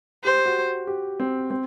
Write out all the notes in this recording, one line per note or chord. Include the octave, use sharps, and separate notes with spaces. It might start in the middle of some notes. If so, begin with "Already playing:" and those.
G4 C5
F#4
G4
C4
C4